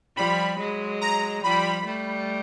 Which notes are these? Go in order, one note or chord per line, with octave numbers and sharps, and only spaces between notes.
F3 G3 B5
F#3 G#3
A#5
F3 G3 B5
G3 A3